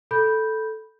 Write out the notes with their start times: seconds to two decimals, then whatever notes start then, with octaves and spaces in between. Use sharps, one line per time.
0.11 A4 B5 G6